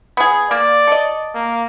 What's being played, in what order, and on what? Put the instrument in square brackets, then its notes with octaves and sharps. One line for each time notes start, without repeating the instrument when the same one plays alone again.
[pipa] B3 G#4
[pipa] A#3 [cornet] D5
[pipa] A4 D#5
[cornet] A#3